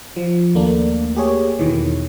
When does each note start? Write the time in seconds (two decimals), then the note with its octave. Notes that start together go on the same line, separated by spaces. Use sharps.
0.16 F3
0.55 D#2 A3 A#3 D4
1.15 A#3 G4 G#4 C#5
1.59 E2 B2 D#3 E3